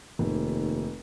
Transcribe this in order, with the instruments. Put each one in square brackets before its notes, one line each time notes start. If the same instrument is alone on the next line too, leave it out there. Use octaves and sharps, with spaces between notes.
[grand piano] F1 [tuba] D#2